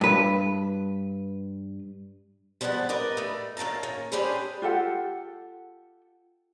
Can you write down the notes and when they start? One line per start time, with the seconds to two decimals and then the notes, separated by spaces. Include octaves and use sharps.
0.01 G2 B4
2.61 F3 G3 G#3 B3 F#5 A5
2.89 A#4 B4 D5 D#5
3.17 G3 A3
3.57 A2 D#3 F5 A5 A#5
3.83 A#3 C#4
4.12 C#4 D4 G4 G#4 B4 C5
4.62 F4 G4 A4 F#5